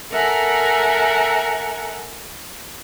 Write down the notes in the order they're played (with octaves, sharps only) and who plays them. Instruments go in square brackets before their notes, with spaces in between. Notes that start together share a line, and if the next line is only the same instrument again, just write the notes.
[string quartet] A4 A#4 E5 F#5 G#5 A#5